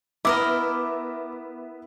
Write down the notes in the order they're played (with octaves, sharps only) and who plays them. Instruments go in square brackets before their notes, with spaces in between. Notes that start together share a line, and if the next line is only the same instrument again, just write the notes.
[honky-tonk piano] B3 E5 [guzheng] E4 A#4 D#5 [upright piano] D6